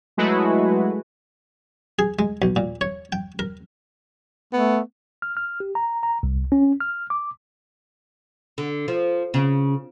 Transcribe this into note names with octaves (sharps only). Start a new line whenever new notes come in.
F#3 G#3 A3 E4 F#4 B4
G#4
G#3
B1
A#2
C#5
G5
A#4
A3 B3
F6
F6
G4
A#5
A#5
C2
C#4
F6
D6
D3
F3
C#3